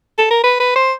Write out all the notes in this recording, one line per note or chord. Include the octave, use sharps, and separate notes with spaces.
A4
A#4
B4
B4
C5